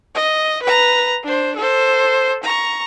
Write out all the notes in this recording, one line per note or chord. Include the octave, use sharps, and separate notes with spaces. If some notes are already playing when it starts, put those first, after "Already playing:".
D#5
B4 A#5
D4 C5
A4 C5
A#5 C#6